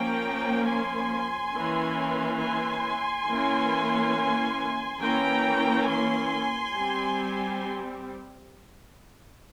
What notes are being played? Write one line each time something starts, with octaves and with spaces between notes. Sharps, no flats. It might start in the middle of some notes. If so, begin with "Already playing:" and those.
Already playing: F3 A#3 C#4 G5 A#5
G#5 C6
E3 A#3 C#4
G#5 C6
E3 A#3 C#4
E3 A#3 C#4 G5 A#5
G#5 C6
G3 C4